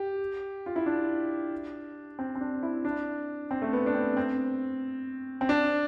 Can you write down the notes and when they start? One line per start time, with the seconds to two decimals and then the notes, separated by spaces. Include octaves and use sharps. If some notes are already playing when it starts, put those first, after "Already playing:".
Already playing: G4
0.66 F4
0.76 E4
0.86 D4
2.19 C4
2.35 C4
2.41 D4
2.63 E4
2.85 D4
3.51 C4
3.62 A3
3.73 B3
3.86 D4
3.95 C4
4.17 C4
5.41 C4
5.49 D4